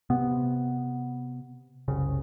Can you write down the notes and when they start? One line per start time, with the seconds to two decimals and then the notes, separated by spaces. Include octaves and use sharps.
0.10 C3 B3
1.88 F#1 C2 C#3